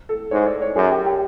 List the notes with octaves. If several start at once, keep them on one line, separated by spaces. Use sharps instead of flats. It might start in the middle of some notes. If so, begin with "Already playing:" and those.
A4
G#2 C#5
D5
C#5
F#2 G#4
G4
G4